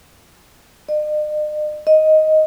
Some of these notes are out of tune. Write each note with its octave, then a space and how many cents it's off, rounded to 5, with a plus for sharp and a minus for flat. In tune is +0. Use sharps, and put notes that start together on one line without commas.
D#5 -45
D#5 +5